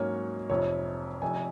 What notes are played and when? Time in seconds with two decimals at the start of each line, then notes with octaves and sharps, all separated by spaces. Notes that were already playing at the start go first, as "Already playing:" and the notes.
Already playing: G#2 F#3 A#3 C#4 C#5
0.50 F1 F2 C3 F3 C4 C#5
1.22 F1 F2 C3 G#5